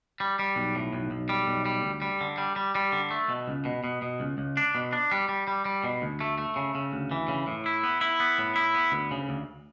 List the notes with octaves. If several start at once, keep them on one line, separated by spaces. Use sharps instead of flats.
G3
G3
B1
A2
B1
B1
G3
B1
G3
D2
G3
D3
G3
G3
G3
D3
A3
B2
C#2
B2
B2
B2
C#2
C#2
D4
B2
D4
G3
G3
G3
G3
B2
D2
A3
A3
C#3
C#3
D2
E3
C#3
A2
E4
B3
E4
B3
A2
E4
B3
D2
C#3
D2